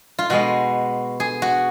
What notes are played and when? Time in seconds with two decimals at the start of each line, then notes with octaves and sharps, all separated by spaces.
0.19 F4
0.30 B2 G#3 B3 F#4
1.20 G#4
1.42 F#4